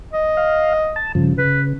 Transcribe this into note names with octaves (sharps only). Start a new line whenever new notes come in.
D#5
F5
A5
G2 C#3 F3
C#3 B4